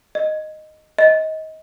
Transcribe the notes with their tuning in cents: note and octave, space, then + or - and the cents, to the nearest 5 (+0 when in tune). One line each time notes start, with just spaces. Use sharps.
D#5 -10
D#5 +25